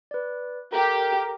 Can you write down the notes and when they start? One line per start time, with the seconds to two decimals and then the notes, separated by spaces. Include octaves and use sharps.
0.11 B4 D5
0.72 G4 A4 A#4